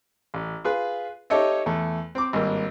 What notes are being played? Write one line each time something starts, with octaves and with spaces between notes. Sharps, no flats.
A1
F4 G#4 B4
D#4 G4 A4 C#5 D#5 E5
E2 A3
C4 D6
G#1 G2 A#3